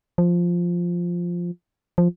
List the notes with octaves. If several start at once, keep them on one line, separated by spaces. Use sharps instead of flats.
F3
F3